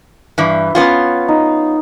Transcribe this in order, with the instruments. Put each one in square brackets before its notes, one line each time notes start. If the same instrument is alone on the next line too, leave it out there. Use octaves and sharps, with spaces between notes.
[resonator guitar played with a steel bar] G2 E3
B3 C#4 F4
[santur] D#4